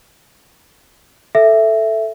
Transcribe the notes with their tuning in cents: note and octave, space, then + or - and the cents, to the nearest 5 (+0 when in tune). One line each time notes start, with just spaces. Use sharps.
A4 +0 E5 +5